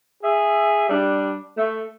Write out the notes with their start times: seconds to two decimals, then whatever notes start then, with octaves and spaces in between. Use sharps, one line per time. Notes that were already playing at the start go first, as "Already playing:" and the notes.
0.23 G#4 E5
0.89 G3 D4
1.57 A3